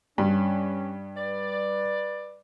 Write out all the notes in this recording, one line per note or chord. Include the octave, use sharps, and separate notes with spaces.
G2 C#4
B4 D5